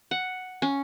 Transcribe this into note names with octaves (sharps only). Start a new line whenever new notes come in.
F#5
C#4